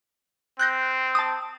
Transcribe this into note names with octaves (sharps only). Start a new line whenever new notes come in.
C4 F#6 G6 A#6
A5 D#6